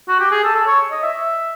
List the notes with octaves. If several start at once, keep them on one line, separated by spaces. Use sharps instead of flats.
F#4
G4
G#4
A4
A4
C#5
D#5
E5